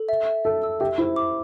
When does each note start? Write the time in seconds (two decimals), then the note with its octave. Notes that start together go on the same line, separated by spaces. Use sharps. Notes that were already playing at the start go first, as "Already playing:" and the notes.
Already playing: A4
0.09 E5
0.26 E5
0.44 A4 E5
0.63 E6
0.80 G4 E5
0.98 E4 C5
1.16 D6